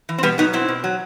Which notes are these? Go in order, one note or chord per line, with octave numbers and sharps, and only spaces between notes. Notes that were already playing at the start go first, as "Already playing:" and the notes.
E3
C4
B2 G3 B3
F#3 B3 D#4
B2 C4 E4
B2
F#3